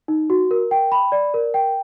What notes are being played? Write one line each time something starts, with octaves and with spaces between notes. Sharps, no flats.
D#4
F#4
A#4
G5
B5
D5
A#4
G5